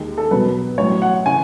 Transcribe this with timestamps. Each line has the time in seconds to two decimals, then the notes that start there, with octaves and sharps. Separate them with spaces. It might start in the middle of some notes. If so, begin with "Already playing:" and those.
Already playing: D#2 D#3 G#3
0.18 A4
0.31 B1 B2 F#3 B4
0.78 A1 A2 F#3 C#5
1.02 F#5
1.26 C#3 E3 G#5